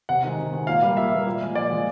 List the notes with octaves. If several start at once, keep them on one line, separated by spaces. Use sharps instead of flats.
C3 F#5
D#3 G#3
C3
D#3 G#3
A#2 F5
G3 A#3
A#2 E5
G3 A#3
A#2
F3 G#3
A#2 D5
F3 G#3